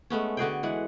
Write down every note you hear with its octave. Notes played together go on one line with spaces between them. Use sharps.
G#3 A3 B3 C#4
D3 F#4 G#4 G5
E3 G#3 F#5